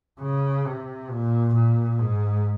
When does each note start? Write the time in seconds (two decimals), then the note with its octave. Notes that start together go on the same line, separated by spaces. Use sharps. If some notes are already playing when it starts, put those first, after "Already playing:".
0.21 C#3
0.66 C3
1.10 A#2
1.54 A#2
1.99 G#2